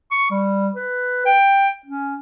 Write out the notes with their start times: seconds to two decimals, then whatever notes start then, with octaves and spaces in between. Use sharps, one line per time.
0.11 C#6
0.31 G3
0.75 B4
1.26 G5
1.86 C#4